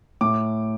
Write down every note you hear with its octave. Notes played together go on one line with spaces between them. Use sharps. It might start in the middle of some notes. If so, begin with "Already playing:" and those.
A2 D6